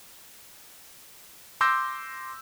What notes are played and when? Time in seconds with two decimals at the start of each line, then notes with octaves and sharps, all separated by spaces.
1.61 C6 D6 E6 G6 A#6